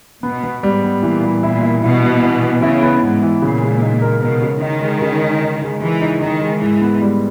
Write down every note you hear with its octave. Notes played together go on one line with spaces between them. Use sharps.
B2 B3
B3
G#2 G3
B3
A#2 E3
G3
A#2 E4
E4
B2 E4
B3
E3
B3
C#3 E4
B3
G#2 B3
E3
A#2 C#3
G#3
D#4
A#4
B2 A#4
C#3
D#3 D#4
G#3
C#3
G#3
D#4
G#3
E3 G#3
D#4
D#3 D#4
G#3
G#2 E3
B3
G3